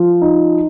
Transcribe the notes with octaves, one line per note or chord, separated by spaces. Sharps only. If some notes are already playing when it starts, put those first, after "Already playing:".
Already playing: F3
D#4